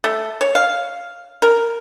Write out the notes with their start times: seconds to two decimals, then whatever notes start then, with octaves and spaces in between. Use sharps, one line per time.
0.04 A3
0.41 C#5
0.55 F5
1.42 A#4